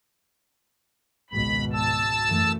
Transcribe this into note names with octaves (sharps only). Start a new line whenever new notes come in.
G#1 C#2 B2 B5
A5 E6
F#2 E3 A3